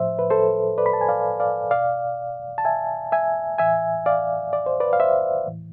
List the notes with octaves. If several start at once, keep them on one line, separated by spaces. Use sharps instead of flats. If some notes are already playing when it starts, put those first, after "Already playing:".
Already playing: A2 F3 C5 E5
B4
A4 C5
B4 D5
B5
A5
G#5
D5 F5
D5 F5
B2 D5 F5
A5
E5 G#5
E5 G#5
A2 E3 E5 G#5
D5 F5
D5
C5
B4 D5
F5
C5 E5
A2 E3